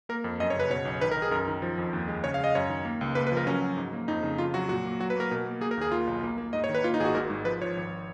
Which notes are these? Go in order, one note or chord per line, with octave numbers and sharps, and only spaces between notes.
A#3 A#4
F2
F#2 D#5
C#5
C#3 B4
B2 C#5
B1
D#3 B4
A#4
D#3
G#4
F#2 A#4
D#3
F3
F2
D#2
G#3
C#3 C#5
F5
G#3 D#5
F#2 C#5
D#3
A#3
C#2
A#3 B4
B4
F3 A#4
F#3 C#4
F#3
G#2
A#3
F2 D#4
C#3
F2 F4
F#3 F#4
A#2 F#4
A#3
F#3 F#4
B4
A#3 A#4
B2
A#3
A#3 G#4
A#4
D#2 G#4
A#3 F4
B1
A#3
A#3
G#2 D#5
C#5
D#3
B4
A#3 F4
D#4
G#1 G#4
F#4
G#2 A#4
G#2
F3 B4
F3 C#5
G#1